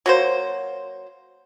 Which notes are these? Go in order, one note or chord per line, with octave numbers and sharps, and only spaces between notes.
F#3 A#3 C5